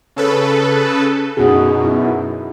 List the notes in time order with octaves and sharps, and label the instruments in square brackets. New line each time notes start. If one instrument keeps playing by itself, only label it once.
[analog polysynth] C#3 A4 B4
[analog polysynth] F#2 B2 [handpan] D#4 F#4 G#4
[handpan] E4